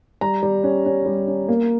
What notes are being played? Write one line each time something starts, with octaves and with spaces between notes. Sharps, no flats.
G3 A#5
G3
C#4
C#4
G3
C#4
A#3